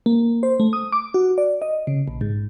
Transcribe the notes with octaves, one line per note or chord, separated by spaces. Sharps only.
A#3
C5
A3
D#6
D6
F#4
D5
D#5
C#3
A#1
G#2